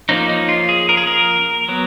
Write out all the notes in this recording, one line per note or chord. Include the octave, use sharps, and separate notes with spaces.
F3 A#3 C#4 D#4
D#4
F4
G#4
A#4
G#4
A#4
F#3 B3